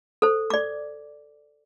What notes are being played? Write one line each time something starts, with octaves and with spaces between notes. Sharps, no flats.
A4 C5
D5 D6